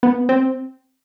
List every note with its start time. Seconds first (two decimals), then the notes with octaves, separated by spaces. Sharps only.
0.03 B3
0.29 C4